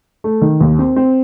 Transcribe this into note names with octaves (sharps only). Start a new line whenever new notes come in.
A3
D#3
D#2
C4
C4